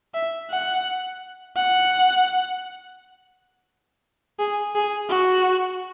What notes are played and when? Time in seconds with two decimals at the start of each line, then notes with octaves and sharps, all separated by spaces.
0.14 E5
0.50 F#5
1.56 F#5
4.39 G#4
4.75 G#4
5.10 F#4